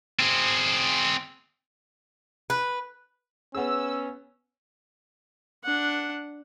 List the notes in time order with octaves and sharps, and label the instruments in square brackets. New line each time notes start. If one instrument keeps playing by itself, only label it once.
[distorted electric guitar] C4 G#4
[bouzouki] B4
[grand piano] B3 G#4 [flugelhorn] C#4 [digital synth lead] E6
[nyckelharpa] D4 F#5